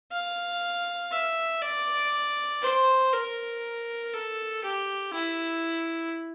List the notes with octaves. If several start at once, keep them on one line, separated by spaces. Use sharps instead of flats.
F5
E5
D5
C5
A#4
A4
G4
E4